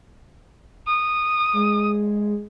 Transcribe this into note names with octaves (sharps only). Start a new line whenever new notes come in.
D#6
G#3